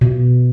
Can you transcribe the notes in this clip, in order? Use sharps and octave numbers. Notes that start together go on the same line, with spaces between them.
B2